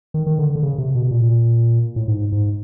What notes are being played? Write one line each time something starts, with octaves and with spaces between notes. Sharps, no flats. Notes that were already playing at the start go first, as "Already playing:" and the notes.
D#3
D#3
D3
D3
C#3
C3
B2
A#2
A2
G#2
G#2